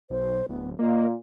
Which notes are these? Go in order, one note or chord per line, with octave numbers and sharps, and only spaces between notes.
B1 C5
D1 B3
A#2 A#3 D#5